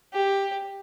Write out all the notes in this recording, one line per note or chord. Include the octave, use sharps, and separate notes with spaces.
G4